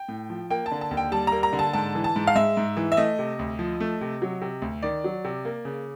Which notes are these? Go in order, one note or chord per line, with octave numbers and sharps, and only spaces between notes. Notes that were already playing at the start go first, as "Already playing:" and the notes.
Already playing: G5
A2
F3
A#3 G5
A5
D3
A5
D#2
G5
G3 A5
A#3 A#5
A#5
D3
A5
G#2 A5
E3
A5
G#2
F5
G#3 E5
G#2
E3
E5
A3 D#5
C3
D2
F3
A3
C3
F#3
C3
D2
D#3 D5
F#3
C3
A#3
C#3